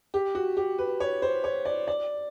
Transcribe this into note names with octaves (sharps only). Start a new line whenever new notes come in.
G4
F#4
G4
B4
C#5
C5
C#5
D5
D5